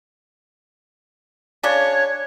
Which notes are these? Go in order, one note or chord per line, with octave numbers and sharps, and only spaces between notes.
C#3 D4 C#5